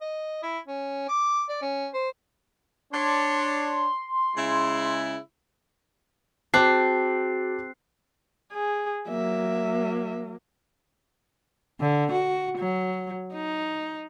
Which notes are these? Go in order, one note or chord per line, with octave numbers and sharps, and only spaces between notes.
D#5
E4
C#4
D6
D5
C#4
C5
D4 C#5 C6
C#3 G#3 E4
C4 F#4 G#4 A5 D6 F#6 C7
G#4
F#3 A#3 E5
D3
F#4
F#3
D#4